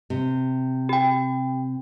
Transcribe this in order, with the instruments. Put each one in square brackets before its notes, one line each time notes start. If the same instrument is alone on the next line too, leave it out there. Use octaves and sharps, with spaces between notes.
[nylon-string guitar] C3
[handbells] G4 G5